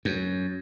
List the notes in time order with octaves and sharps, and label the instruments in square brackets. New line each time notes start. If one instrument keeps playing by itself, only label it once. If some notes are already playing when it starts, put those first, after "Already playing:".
[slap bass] F#2